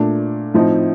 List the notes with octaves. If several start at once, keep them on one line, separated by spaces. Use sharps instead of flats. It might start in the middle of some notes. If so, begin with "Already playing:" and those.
Already playing: A#2 A3 D4
A2 F3 C4 D#4